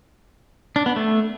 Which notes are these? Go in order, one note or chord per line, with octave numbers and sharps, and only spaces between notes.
D4
B3
A3